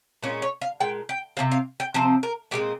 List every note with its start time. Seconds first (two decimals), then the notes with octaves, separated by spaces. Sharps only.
0.23 A#2 G#3 C#4 F4
0.42 C#5
0.61 F5
0.80 A#2 G#3 G5
1.09 G5
1.37 C3 F3 C4 F5
1.52 F5
1.80 G5
1.94 C3 F3 C4 C5
2.23 A#4
2.51 A#2 G#3 C4 G4